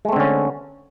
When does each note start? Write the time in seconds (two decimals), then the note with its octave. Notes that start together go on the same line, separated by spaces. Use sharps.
0.05 G#3
0.09 A3
0.12 C4
0.16 D3
0.20 C#4